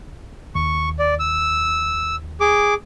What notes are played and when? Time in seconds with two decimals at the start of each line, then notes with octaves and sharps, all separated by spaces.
0.55 D#2 C#6
0.99 D5
1.19 E6
2.40 G#4 D6